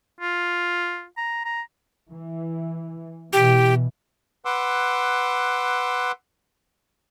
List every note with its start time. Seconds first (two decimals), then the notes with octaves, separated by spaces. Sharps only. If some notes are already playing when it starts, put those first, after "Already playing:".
0.21 F4
1.17 A#5
1.45 A#5
2.09 E3
3.33 B2 E3 G4
4.45 B4 F#5 C6 D6 E6